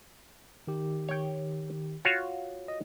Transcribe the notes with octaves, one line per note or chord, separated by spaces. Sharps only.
D#3 G4
C#5 G5
F4 F#4 C#5
D#5